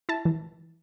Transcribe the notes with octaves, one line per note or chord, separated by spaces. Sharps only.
E4 A5
E3